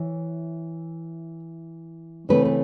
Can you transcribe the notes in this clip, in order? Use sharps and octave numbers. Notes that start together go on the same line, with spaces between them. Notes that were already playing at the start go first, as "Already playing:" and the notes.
Already playing: E3 C#5
C#3 E3 A3 C4 B4
B4